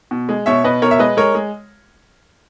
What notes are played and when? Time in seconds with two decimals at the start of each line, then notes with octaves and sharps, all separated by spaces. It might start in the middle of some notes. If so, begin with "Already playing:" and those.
0.11 B2
0.29 G#3
0.46 B2 C#5 E5
0.64 B2 B4 D#5
0.82 B2 A#4 C#5
0.91 E5
0.99 G#3 B4 D#5
1.17 G#3 A#4 C#5
1.35 G#3